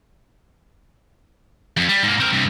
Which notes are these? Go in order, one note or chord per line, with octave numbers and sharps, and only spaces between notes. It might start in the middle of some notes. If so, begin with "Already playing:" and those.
F2
G3
G#2 A#3
C4 A#4
G2 C3